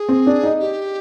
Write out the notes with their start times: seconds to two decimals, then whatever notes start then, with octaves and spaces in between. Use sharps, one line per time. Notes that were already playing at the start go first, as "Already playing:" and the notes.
Already playing: G#4
0.09 C4
0.27 D4
0.43 D#4
0.60 G4